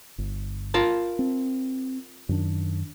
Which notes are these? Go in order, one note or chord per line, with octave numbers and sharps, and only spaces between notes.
G1
F4 A#4 A5
C4
F#2 D#3 D4